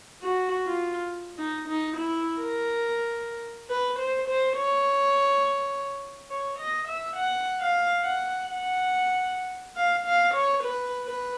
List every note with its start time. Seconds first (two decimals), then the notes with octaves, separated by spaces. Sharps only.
0.23 F#4
0.66 F4
1.38 D#4
1.68 D#4
1.97 E4
2.40 A#4
3.70 B4
3.99 C5
4.28 C5
4.57 C#5
6.30 C#5
6.59 D#5
6.88 E5
7.16 F#5
7.60 F5
8.04 F#5
8.47 F#5
9.76 F5
10.05 F5
10.34 C#5
10.63 B4
11.06 B4